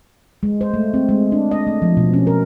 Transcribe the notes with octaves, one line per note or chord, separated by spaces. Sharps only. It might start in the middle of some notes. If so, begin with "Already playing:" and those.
G#3
C5
A3
C4
G#3
D4
D#5
A3
F3
B2
C#4
A#4